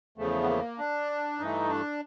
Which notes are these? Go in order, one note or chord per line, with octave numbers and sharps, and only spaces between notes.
E2 C#3 F3 A3
B3
A#3
D4
G2 E3 A3 D#4
D4